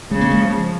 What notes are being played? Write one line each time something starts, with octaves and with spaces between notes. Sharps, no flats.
C#3 G#3
A#3
G#3
F3